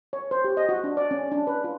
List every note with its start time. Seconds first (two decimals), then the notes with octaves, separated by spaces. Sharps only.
0.13 C#5
0.31 C5
0.44 G4
0.57 D#5
0.69 F#4
0.84 D4
0.97 D5
1.11 C#4
1.32 D4
1.47 B4
1.64 F4